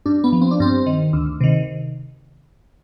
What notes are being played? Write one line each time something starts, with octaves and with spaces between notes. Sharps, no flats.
G2 D4
B3
F3
C4
D4
G2 C4
D#3
D2
C3 D#3